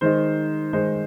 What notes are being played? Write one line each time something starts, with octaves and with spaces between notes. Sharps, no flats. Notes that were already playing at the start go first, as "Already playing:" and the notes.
D#3 G#3 D#4 C5
D#3 G#3 D#4 C5